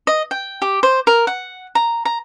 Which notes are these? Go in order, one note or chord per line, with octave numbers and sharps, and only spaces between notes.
D#5
G5
G4
C5
A#4
F#5
A#5
A#5